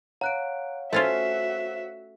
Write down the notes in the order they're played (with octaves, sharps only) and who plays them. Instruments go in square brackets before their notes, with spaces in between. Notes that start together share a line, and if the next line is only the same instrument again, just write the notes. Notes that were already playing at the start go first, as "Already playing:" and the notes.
[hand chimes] C#5 F5 F#5 [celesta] A#5 F#6 D7
[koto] A3 C#4 F4 [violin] F#4 E5 [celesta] C5 C7